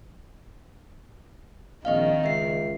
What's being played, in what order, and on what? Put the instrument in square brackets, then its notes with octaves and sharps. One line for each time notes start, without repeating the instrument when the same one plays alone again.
[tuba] A#1 [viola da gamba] D#3 [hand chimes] C4 D#5 F5
[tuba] C#2 [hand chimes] E5 C7